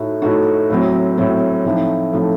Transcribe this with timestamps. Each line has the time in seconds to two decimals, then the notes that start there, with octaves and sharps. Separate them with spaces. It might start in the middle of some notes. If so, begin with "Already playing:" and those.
Already playing: A2 A3 D#4 F#4
0.22 A2 A3 D#4 F#4
0.70 A2 F#3 C4
1.18 A2 F#3 C4
1.64 A2 F3 A3 C4 D#4
2.13 A2 F3 A3 C4 D#4